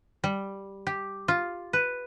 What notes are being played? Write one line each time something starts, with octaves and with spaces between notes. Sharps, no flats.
G3
G4
F4
B4